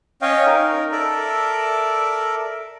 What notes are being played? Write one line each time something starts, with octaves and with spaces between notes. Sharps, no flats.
C#4 C#5 D#5 F5 G5
D#4 A#4
A4 A#4 D5 E5